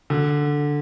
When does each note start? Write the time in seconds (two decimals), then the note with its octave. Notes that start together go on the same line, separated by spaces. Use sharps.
0.10 D3